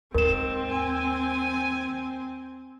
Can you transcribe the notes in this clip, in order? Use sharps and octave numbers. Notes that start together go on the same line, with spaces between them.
D#2 G#2 C4 A#4 E7
G#5